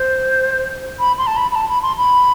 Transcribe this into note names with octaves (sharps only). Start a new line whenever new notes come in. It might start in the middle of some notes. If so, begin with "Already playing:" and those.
Already playing: C5
B5
C6
A5
B5
B5
A5
B5
C6
B5